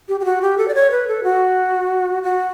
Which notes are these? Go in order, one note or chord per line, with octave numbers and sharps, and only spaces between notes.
G4
G4
F#4
G4
A4
D5
C#5
B4
A4
F#4
F#4